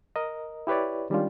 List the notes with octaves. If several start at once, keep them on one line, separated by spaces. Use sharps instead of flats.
A#4 D#5
E4 G4 B4 C#5 D5
D#3 G3 G#3 C#4 D4 F4